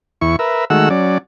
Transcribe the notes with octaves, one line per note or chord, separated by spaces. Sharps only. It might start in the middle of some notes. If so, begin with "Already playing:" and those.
E2 E4 C#6
A#4 B4 E5
D#3 G#3 A3 F#4 F#5 E6
F#3 C#4 D5